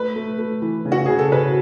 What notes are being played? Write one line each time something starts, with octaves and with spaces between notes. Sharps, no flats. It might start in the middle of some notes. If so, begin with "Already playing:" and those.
Already playing: A3 B4
A3
A3
E3
C#3
F#4
C#3 G#4
A4
C#3 B4